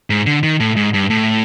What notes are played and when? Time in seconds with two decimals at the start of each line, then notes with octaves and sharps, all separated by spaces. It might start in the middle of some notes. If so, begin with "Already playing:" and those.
0.10 G#2
0.26 D3
0.43 D#3
0.60 A2
0.76 G#2
0.94 G2
1.10 A2